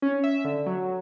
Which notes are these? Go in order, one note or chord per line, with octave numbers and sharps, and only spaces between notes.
C#4
E5
D3
F#3